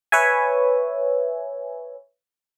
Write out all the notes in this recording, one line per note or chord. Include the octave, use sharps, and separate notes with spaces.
B4 C#5 E5 G#5